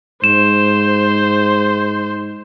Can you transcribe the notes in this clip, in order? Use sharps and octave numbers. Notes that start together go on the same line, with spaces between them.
G#2 C5 E7